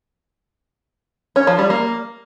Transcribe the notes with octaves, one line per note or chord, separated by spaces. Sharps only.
C#4
F3
G3
A#3